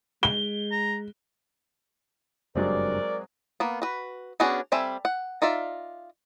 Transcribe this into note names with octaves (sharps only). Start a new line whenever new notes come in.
G#3 G7
A#5
F#1 G2 F#3 G#3 C4 A#4 D5
A#3 B3
F#4 B4
B3 C#4 D4 F#4 G#4
G3 C4 A4 E5 G#5
F#5
D#4 F4 D5 E5